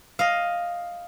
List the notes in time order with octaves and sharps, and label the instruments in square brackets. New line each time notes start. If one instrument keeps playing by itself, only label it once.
[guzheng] D#5 F5